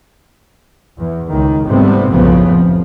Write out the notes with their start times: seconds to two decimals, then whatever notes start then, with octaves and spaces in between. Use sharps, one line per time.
0.98 E2
1.30 C#2 D#3
1.66 G#1 C3 G3 A3 B3 C4
2.09 B1 F#2 A2 C#3 F3 B3
2.46 F1 F3